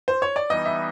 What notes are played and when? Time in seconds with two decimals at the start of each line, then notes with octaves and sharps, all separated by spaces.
0.08 C5
0.22 C#5
0.36 D5
0.50 E3 G3 B3 D#4 D#5
0.65 E5